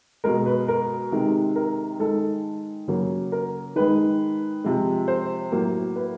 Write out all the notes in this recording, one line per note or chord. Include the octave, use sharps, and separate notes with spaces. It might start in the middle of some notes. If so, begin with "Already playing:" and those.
B2 G#3 A#4
B4
A#4
C3 D#3 G#3
A#4
D#3 G#3 A4
C#3 F#3 A#3
A#4
D#3 G#3 B4
C3 F3 G#3
C5
A2 F#3 A#3
B4